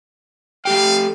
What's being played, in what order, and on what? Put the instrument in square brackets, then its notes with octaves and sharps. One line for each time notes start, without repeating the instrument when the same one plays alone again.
[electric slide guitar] A3 G4 G5 [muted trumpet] F5